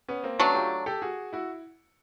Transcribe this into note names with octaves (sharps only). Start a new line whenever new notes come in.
B3 C#4
A#3 C4
F#3 A3 B3 C#4 D4
F4 G4
G4 A4
F#4 G#4
E4 F#4